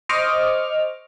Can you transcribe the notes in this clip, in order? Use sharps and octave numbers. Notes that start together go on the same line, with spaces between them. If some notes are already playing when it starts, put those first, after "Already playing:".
C5 D#5 C#6 D6 F6